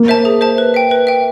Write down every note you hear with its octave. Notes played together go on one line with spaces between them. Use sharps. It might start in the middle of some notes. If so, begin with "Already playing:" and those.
Already playing: A#3
C5 E5 A5
G#4
C5 E5 A5
B4
E5 G5
B4
E5 G5